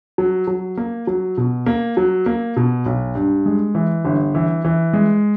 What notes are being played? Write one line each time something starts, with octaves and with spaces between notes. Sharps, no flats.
F#3
F#3
A#3
F#3
B2
A#3
F#3
A#3
B2
B1
G2
G#3
E3
G1
E3
E3
G#3